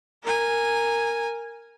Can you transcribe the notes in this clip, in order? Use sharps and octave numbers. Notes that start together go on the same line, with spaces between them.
A#4 G#5